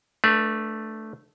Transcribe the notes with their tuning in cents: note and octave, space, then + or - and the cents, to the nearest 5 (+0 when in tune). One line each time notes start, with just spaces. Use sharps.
A3 +0 D4 +0 B4 -30